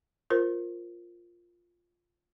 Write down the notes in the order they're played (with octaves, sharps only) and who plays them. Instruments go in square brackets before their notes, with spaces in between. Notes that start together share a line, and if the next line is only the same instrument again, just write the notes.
[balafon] F4 A#4 C5